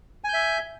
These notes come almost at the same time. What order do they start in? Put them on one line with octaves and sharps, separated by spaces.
G#5 G6 E5